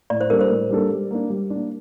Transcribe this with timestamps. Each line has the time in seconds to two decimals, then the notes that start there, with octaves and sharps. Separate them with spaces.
0.10 A2 D5
0.21 C5
0.30 G3 A#3 D4 A4 A#4
0.41 C5
0.50 A2
0.70 G3 A#3 D4 A4
0.91 G3
1.11 A#3 D4
1.30 G3
1.50 D4
1.55 A#3